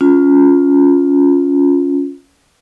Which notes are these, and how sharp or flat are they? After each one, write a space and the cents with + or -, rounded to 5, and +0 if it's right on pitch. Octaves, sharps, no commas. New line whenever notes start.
C#4 +15 F4 +10